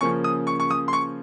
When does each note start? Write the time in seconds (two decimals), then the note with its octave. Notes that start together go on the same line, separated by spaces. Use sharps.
0.01 C#3 F3 A#3 C#4 C#6
0.24 D#6
0.47 C#6
0.60 C#6
0.71 D#6
0.88 C6
0.93 C#6